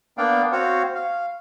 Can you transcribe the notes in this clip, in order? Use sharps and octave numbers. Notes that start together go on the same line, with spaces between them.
A#3 B3 D4 D5 F5 G5
C4 F#4 C5 C#5 F5 F#5
F5